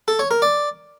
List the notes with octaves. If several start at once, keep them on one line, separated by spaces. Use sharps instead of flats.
A4
C#5
A#4
D5